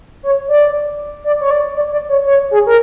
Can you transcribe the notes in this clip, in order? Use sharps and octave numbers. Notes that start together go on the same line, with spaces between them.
C#5
D5
D5
C#5
D5
D5
D5
C#5
C#5
G#4
A#4